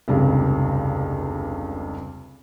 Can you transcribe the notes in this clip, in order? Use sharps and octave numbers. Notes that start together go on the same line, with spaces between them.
F1 C#2 G2